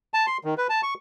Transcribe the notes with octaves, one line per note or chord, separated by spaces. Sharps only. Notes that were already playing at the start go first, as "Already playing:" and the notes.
A5
C6
D#3
B4
A5
C#6